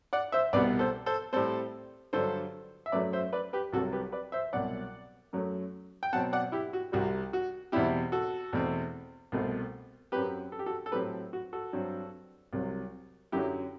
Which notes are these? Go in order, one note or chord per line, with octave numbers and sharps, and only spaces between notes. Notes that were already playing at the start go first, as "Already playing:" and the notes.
D5 F#5
C5 E5
C2 B2 G3 B3 B4 D5
A4 C5
A4 C5
A2 G3 C4 A4 C5
G2 D3 F#3 A4 C5
E5
F#2 F#3 A3 B4 D5
C5 E5
B4 D5
G4 B4
C2 C3 F#3 F#4 A4
G4 B4
B4 D5
C5 E5
C2 B2 F#3 D5 F#5
F#2 F#3 A3
G5
B2 F#3 C4 F#5 A5
D5 F#5
E4 G4
F#4
C2 C3 G3 F#4
F#4
E2 B2 G3 C4 E4 G4
F#4 A4
E2 B2 A3 C4
C2 B2 A3 C4
F#2 F#3 C4 G4 B4
A4
G4
F#4 A4
A4
A2 F#3 C4 G4 B4
F#4
F#4 A4
G2 F#3 C4
C2 C3 F#3
F#2 D3 F#3 E4 G4